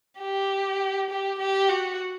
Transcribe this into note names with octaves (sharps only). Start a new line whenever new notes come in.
G4
G4
G4
F#4